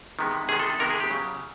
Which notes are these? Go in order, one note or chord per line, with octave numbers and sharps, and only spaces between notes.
C3 D#3 G#3 B3
C3 D#3 G#3 B3 G#4
A4
A4
C3 D#3 G#3 B3 A#4
G#4
G4
C#3 F#3 B3